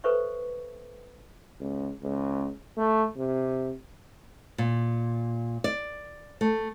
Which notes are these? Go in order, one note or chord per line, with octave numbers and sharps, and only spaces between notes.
A4 B4 C5 E5 C#6
C#2
C#2
A3
C3
A#2
D5
A3